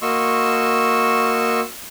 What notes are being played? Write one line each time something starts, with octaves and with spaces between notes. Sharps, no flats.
A#3 F#4 D#5 C6 C#6 E6